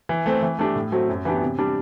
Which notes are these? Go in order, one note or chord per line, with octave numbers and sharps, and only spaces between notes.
E3
A3 C4
E3
A3 D4 G4
A2
F#3 A3 C4
F#2
E3 B3 D4 G4
C3
G3 D4